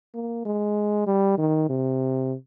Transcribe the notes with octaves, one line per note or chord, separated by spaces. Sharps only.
A#3
G#3
G3
D#3
C3